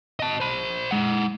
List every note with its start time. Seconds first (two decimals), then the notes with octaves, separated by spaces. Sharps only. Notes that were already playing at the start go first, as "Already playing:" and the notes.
0.20 D#5 A5
0.40 C5 B5
0.91 G#3 F#5